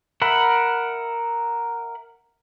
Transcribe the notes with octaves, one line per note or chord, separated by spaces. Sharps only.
A#4 E5 F#5 B5